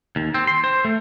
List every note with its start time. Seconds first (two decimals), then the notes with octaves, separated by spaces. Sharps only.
0.16 D#2
0.34 C4
0.47 C6
0.64 C5
0.85 A3